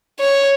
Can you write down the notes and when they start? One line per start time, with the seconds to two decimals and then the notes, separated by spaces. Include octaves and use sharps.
0.19 C#5